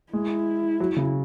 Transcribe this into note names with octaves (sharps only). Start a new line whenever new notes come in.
G#3 E4
F#3
C#3